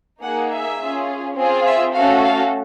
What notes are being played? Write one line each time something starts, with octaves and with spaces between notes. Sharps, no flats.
A#3 D#4 G#4 F#5
E5
C#4 F4 G#4
C4 F4 G#4
E5
A3 C#4 F#4 A4 F5
F5